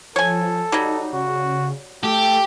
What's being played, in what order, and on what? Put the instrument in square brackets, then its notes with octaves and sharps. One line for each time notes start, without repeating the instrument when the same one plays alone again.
[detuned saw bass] F3 [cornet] A4 [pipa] C#5 G#5
[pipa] F#3 G3 [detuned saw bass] D#4
[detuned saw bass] C#3 [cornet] F#4
[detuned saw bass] A3 [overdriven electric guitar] G4 [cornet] A4